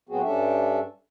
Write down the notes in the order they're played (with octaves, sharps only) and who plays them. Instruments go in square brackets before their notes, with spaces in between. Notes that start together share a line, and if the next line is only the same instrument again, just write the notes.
[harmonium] A2 F#3 B3 C4 F#4 G#4
G2 G3 C#4 D4 A4 E5